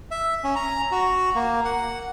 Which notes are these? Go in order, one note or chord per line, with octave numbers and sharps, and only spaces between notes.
E5
C#4
A#5
F#4
A#3
F#5